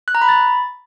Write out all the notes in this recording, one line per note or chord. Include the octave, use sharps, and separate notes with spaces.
F#6
A#5
B5
A6